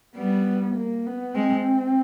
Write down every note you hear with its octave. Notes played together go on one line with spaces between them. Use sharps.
G3 B3
A#3
B3
G#3 C4